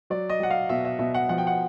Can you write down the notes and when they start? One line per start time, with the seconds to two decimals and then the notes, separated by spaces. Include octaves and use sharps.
0.10 F#3 D5
0.30 D#5
0.40 F#3 F#5
0.51 F5
0.69 B2 E5
0.85 E5
0.99 B2 E5
1.14 F#5
1.29 F3 F#5
1.38 G5
1.47 F#5